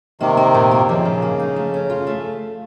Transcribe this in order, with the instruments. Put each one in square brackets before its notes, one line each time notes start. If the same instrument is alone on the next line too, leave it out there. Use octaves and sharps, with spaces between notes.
[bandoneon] C3 D#3 [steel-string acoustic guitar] A#3
[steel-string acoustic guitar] A#3
A#2
A#3
[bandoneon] C#3 [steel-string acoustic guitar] F3
[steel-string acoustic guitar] A#2
A#3
D#4
A3
C#4
F4
A3